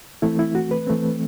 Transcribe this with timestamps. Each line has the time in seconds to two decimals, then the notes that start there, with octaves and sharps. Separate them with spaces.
0.22 E3 A3 C4 E4
0.39 E4
0.55 F#4
0.71 B4
0.87 E3 A3 C4